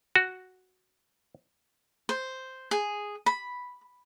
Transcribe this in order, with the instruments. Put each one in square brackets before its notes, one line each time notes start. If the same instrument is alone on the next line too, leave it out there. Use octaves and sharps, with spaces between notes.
[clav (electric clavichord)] F#4
[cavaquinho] C5
G#4
B5